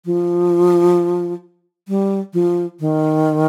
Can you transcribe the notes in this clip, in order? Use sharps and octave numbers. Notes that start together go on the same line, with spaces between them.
F3
G3
F3
D#3